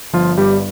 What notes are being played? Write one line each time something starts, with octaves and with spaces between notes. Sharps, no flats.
G1 F3 F4
G2 G3 G4